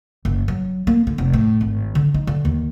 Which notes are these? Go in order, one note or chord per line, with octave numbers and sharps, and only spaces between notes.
F#1
F#3
A#3
D3
F1
A2
G#1
D3
D#4
D3
D#2